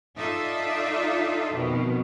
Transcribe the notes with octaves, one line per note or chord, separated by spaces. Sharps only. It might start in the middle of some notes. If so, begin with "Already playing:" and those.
D#4 F4 A4 D5 E5
F2 B2 D#3